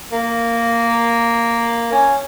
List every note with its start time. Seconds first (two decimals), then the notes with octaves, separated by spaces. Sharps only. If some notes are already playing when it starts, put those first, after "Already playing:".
0.12 A#3
1.92 C#4